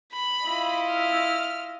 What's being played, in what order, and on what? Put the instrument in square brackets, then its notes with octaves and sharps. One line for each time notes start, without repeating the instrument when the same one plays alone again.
[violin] B5
[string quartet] E4 F4 D#5
[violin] F6